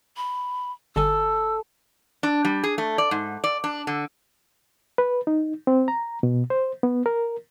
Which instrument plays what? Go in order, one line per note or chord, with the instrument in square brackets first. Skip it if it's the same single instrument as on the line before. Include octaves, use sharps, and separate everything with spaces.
[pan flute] B5
[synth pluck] G1 D3 G#5 [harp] A4 [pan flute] E6
[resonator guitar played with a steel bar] D4
G3
G#4
A3
D5
G#2
D5
D4
D3
[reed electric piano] B4
D#4
C4
A#5
B2
C5
B3
A#4